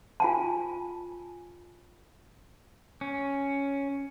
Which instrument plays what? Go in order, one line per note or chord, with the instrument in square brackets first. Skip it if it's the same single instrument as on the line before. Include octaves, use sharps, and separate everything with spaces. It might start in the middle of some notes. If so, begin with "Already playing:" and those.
[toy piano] F4 G#5 A5
[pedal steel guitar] C#4